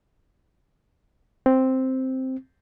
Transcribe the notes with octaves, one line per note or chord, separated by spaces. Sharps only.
C4